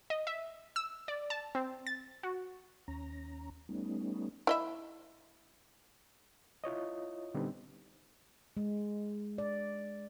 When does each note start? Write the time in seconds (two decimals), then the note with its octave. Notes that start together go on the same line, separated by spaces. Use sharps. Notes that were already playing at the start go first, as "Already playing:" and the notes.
0.10 D#5
0.27 E5
0.76 E6
1.08 D5
1.30 A5
1.55 C4
1.87 A6
2.23 F#4
2.88 D#2 C#4 A#5
3.69 G3 A3 B3 C#4 D#4
4.47 E4 D#5 E5
6.64 E4 F4 C#5 D#5
7.34 A#2 D3 G3 B3 C4 D#4
8.57 G#3
9.38 D5